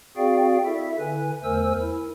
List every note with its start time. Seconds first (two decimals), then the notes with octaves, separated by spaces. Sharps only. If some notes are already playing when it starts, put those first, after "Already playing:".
0.17 C4 F#4 G#4 D5 F5 G5
0.66 E4 A4 E5
1.00 D3 B4 G#5
1.44 E2 A3 A#4 C5 G#5 E6
1.82 E4